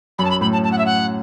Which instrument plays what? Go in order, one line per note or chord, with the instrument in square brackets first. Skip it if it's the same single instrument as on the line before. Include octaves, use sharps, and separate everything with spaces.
[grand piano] F#2 [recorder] B5
[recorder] A5
B5
[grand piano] A2 [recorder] B5
[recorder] A5
A5
F#5
E5
F#5